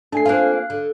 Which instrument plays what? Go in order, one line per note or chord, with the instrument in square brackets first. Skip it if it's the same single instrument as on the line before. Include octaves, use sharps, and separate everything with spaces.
[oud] A3 [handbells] D4 G#5 C7
[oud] A#3 C4 F4 [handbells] F5 F#6
[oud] D3